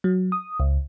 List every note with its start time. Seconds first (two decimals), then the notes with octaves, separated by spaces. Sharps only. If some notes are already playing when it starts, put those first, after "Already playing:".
0.04 F#3
0.32 D#6
0.60 C#2